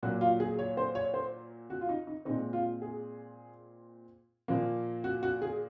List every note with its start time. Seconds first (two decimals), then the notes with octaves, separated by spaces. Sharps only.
0.03 A#2 F#3 A#3 F#4
0.21 F4
0.40 G#4
0.59 C#5
0.77 C5
0.95 C#5
1.14 C5
1.70 F#4
1.81 F4
1.89 D#4
2.07 D#4
2.25 A#2 G#3 C4 D#4
2.53 F4
2.82 G#4
4.48 A#2 F3 A#3
5.04 F#4
5.23 F#4
5.42 G#4